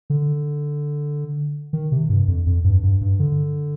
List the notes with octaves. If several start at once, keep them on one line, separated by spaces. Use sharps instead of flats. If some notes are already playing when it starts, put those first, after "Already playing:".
D3
D#3
C3
G2
F2
F2
G2
G2
G2
D3